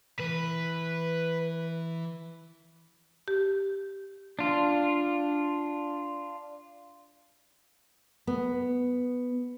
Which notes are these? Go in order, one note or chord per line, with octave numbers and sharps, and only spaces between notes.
E3 B4
G4
D4 F4
B3